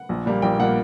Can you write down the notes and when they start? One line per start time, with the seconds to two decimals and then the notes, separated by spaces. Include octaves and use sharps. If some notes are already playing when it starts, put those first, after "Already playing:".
Already playing: F#5
0.09 A#1
0.26 A#2 G3 A#3
0.42 A#1 G5
0.59 A#2 G3 A#3 F#5